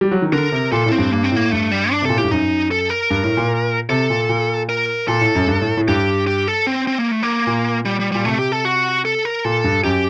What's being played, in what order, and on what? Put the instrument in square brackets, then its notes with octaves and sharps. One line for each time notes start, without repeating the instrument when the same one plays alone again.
[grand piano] G3
F#3
D#3
[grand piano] D3 [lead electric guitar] A#4
[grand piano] C3
[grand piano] A#2 [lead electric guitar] A4
[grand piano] A2
[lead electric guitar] C4
[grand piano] G2
[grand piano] G2 [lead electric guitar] A#3
[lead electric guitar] C4
[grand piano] A2 [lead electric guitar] A#3
[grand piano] G2 [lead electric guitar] A3
[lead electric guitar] G3
D4
[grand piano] C3
[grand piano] A#2 [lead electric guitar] A4
[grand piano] A2 [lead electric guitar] G4
[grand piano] G2
[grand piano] F#2 [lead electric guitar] D#4
[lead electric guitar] A4
A#4
[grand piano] G2
A2
A#2
[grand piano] C3 [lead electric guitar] A4
[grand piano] A#2
A#2
[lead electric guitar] A#4
[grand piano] A#2 [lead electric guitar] A4
[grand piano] A2
F#2
G2
A2
A2
[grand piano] G2 [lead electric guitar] G4
[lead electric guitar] G4
A4
C4
C4
A#3
A3
A#3
[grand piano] A#2
[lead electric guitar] G3
G3
[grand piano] A#2 [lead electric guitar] G3
[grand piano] C3 [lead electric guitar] A3
[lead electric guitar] G4
A4
F#4
A4
A#4
[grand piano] A#2 [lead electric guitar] A4
[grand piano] G2
[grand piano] F#2 [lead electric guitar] G4